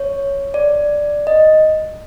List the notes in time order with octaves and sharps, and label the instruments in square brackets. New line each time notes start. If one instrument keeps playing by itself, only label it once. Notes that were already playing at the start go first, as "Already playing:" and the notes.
Already playing: [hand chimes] C#5
D5
D#5